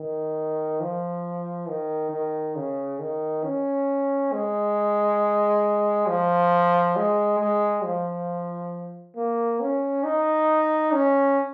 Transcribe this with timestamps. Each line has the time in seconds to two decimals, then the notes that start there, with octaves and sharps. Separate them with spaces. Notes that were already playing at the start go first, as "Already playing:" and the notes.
Already playing: D#3
0.80 F3
1.68 D#3
2.12 D#3
2.55 C#3
2.99 D#3
3.44 C#4
4.32 G#3
6.08 F3
6.96 G#3
7.40 G#3
7.84 F3
9.16 A#3
9.60 C#4
10.04 D#4
10.93 C#4